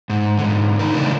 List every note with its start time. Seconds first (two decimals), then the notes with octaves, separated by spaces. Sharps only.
0.10 G#2
0.38 G#2 D3
0.79 A3 D#4 A#4
0.94 C#3 E3 D4 F4 A#4